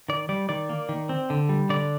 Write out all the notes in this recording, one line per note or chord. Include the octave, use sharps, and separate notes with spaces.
D#3 D5
G3 D5
D#3 D5
A#3
D#3
C4
D3
G3
D3 D5